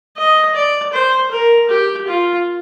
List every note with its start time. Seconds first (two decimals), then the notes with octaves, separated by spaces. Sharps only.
0.17 D#5
0.55 D5
0.93 C5
1.31 A#4
1.69 G4
2.08 F4